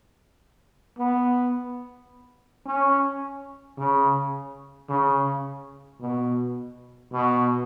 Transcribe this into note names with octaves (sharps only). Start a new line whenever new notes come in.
B3
C#4
C#3
C#3
B2
B2